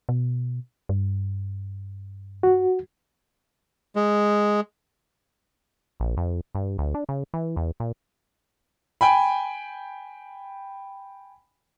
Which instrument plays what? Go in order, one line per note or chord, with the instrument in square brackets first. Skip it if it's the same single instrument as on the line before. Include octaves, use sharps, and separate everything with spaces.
[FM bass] B2
G2
[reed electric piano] F#4
[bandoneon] G#3
[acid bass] A#1
F2
G2
D2
D4
C#3
E3
E2
A#2
[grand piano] G5 G#5 B5